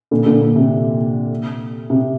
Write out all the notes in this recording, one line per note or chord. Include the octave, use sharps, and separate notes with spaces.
A#2 D3
A#2 D3
A#2
C3
C3